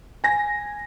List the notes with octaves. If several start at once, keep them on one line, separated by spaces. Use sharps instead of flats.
G#5 A#6